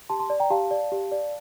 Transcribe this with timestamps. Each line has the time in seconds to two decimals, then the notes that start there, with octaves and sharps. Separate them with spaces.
0.09 G4 A5 C6
0.20 A5 C6
0.30 D5
0.40 G5 A#5
0.50 G4 F5 A5
0.71 D5
0.92 G4
1.12 D5